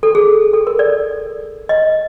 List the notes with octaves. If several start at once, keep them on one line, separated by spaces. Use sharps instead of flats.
A4
G#4
A4
A#4
D5
D#5